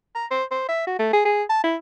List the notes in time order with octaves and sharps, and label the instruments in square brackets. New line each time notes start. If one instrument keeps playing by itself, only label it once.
[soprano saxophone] A#5
C5
C5
E5
F#4
A3
G#4
G#4
A5
E4